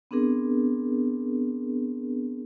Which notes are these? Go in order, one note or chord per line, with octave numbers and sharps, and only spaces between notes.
B3 C4 D4 G#4 A#4